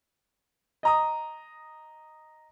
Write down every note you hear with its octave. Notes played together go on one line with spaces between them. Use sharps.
D#5 A#5 D#6